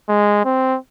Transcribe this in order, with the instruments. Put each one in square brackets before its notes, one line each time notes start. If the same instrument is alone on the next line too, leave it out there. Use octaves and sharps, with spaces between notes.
[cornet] G#3
C4